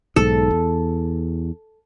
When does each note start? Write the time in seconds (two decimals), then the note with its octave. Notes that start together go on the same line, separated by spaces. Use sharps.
0.16 B1 G#2 A4
0.50 E2